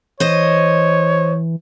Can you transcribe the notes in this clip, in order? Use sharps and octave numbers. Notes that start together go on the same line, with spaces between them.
E3 C5 C#5 D#5